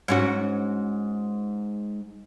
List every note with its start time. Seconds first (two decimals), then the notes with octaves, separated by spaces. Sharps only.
0.08 G#2 C#4 F#4